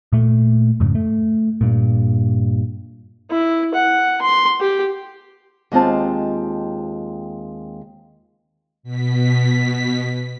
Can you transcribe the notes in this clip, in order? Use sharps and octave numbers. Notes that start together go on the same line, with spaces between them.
A#2 A3
F2 G#2 C#3
A3
G2 A#2
E4
F#5
C6
G4
D#2 G#3 C4 F4 A5
B2 B6